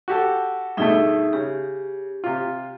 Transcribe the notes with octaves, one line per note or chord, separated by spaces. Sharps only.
F#4 G4 A4
G2 B2 A3 D#4 G#4 E5
C#3 G4
C3 F4